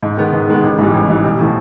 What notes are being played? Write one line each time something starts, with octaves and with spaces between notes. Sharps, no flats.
G#2
D#3 G#3 B3
G#2
D#3 G#3 B3
A1
G#2 E3 G3
A1
G#2 E3 G3
B1
A2 F3